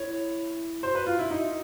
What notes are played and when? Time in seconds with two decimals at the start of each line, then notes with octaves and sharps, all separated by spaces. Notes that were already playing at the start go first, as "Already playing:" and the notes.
Already playing: E4 C#5
0.83 F#4 C5
0.95 B4
1.06 F4
1.19 E4
1.31 D#4